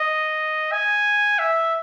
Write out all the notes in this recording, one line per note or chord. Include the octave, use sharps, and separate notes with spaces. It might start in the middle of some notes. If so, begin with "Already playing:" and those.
Already playing: D#5
G#5
E5